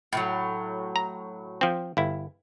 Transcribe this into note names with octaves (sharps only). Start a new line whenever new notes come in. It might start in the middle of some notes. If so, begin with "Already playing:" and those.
A2 D#3 F#3
A#5
F3 C4
G1 E4